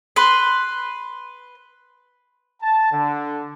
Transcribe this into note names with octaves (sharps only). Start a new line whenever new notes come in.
B4 C6
A5
D3